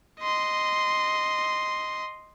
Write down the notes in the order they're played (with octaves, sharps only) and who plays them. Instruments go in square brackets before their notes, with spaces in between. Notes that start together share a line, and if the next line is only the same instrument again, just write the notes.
[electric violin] D#5 C6